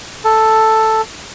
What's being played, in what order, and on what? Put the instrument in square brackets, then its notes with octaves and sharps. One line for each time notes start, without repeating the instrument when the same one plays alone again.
[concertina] A4